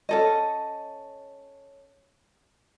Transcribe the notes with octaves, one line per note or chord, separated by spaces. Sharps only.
C#4 A4 D#5